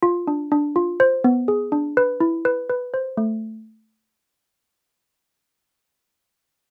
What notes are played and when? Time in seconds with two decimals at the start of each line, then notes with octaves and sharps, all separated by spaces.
0.03 F4
0.27 D4
0.52 D4
0.76 F4
1.00 C5
1.24 B3
1.48 G#4
1.72 D4
1.97 B4
2.21 E4
2.45 B4
2.70 B4
2.94 C5
3.17 A3